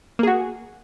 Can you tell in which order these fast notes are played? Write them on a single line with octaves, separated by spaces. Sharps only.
A#3 G#4 F#4